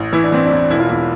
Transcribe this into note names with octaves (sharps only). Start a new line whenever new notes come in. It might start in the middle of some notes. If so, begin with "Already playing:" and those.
Already playing: A1
E3 E4
D4
E3 C4
D4
E2
E1 E4
F4
E2 E4